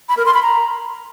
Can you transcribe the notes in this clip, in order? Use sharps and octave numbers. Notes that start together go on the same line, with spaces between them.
B5
A#4
C6
B5
A#5